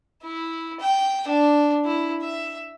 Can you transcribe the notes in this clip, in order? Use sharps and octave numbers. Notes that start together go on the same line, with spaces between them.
E4
G5
D4
E4
E5